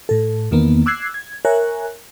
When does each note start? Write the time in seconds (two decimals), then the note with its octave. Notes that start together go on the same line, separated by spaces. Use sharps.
0.09 A2 A4
0.51 E2 D#3 A#3 B3
0.86 D6 E6 F#6 G#6 C7
1.14 G#6
1.45 A#4 C#5 E5 G#5 F#6